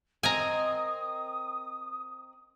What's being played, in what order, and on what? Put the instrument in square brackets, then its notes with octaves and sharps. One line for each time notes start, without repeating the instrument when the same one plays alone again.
[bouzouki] C4 A#4 D#5 [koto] G#5 A#5 [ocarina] D#6